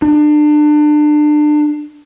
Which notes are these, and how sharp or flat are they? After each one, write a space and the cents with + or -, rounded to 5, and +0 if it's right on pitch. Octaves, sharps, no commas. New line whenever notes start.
D4 +30